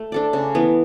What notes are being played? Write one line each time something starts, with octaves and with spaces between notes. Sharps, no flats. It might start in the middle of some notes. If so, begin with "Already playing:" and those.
Already playing: A3
D4 A4 D5
C#3
E3 B3